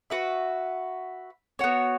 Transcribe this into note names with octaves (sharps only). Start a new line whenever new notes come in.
F#4 B4 E5
B3 F#4 C#5